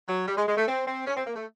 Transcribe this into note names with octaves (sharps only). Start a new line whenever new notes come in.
F#3
G3
G#3
G#3
A3
C4
C4
C#4
C4
A#3
A3